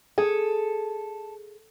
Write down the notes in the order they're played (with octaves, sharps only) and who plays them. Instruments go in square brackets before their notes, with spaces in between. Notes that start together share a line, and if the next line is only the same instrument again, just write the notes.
[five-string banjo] G#4 [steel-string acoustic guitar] A4